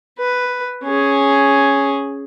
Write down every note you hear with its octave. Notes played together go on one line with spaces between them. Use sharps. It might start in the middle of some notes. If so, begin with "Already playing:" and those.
B4
C#4 G#4